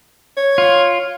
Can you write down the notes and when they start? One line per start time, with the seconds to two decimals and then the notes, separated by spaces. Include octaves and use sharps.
0.37 C#5
0.58 F4